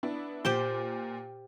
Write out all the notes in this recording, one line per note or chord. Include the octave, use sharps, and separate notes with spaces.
B3 D4 E4
A#2 G4 C5 G5